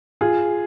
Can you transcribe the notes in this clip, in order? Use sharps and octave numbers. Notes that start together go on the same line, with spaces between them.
F4 G#4